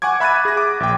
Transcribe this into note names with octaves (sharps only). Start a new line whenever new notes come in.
F#5 G#5 C#6 D6 G#6
E5 B5 F#6 G#6 A6 D#7
G#4 A#6
D6
A#1 G5